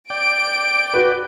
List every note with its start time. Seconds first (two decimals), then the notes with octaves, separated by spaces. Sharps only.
0.10 D5 G5 D7
0.94 F#4 B4